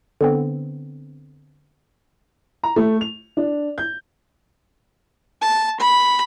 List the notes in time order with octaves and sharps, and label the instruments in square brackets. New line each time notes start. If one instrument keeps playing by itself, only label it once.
[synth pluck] D3 B3 C4
[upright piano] A#5
A3
F7
D4
G6
[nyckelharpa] A5
B5